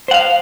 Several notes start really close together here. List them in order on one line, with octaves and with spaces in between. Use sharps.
C5 F#5 F5